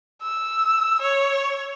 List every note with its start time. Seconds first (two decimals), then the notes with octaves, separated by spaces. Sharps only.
0.22 E6
1.01 C#5